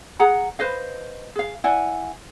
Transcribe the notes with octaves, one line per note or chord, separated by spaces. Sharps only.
G#4 F#5 A#5
B4 C5 D#5 F5
G#4 F5
E4 D5 F#5 G#5